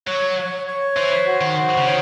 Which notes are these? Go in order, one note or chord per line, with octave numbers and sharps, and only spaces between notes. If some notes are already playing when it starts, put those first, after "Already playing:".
F#3 C#5
C#5
C#5
E3 C5
F#4
D#3
C5
C#3
D#3 C#5